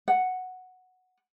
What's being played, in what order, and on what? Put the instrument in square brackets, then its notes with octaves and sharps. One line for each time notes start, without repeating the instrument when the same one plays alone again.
[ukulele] F#5